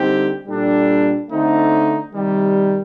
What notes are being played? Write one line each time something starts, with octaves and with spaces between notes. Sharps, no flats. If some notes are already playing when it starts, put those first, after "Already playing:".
Already playing: D3 G3 C4 D#4 G4
A#2 G3 D4 A4
D3 A3 C4 D#4
C3 D#3 G3